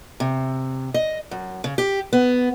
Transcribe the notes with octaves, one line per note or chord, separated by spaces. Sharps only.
C3
D#5
F#2
C#3
G4
B3